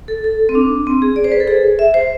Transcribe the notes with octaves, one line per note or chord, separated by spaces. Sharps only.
A4
A4
C4
D4
C4
G#4
D5
C5
B4
A4
G#4
E5
C5